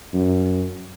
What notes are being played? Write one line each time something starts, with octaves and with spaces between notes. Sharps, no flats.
F#2